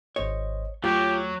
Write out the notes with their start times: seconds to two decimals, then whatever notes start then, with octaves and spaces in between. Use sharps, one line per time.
0.16 G#1 C5 C#5 D#5
0.84 D#2 F#3 A3 F4 G4